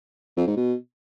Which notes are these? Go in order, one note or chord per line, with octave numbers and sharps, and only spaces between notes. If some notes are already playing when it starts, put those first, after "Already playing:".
F2
G#2
B2